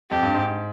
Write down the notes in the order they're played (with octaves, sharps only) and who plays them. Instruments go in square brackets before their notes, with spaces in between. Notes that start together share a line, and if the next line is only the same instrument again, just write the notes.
[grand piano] F2 [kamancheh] G4
[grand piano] G2
G#2